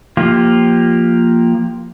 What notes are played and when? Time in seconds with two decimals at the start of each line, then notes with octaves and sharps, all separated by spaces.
0.17 F3 A#3 F4 G4